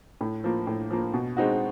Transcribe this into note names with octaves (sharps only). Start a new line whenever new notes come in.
A2
F3 A#3
A2
F3 A#3
B2
G#3 C4 D#4 F#4